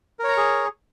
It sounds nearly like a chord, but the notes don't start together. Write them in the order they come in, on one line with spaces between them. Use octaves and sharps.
A#4 C#5 A#5 C#6 G#4